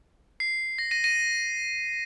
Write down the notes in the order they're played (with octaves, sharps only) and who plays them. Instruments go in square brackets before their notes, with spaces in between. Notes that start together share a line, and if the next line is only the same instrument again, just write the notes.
[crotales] C7
A#6
A#6 D#7
A#6 D#7